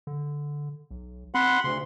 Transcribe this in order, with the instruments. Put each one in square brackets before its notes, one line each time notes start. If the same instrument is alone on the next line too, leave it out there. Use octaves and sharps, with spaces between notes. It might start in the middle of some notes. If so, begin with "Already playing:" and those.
[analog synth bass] D3
B1
[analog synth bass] C4 [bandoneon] F#5 B5 C6
[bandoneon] D2 C6 [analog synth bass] C#3